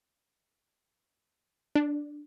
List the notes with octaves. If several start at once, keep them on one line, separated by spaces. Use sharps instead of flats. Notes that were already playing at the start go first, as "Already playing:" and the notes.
D4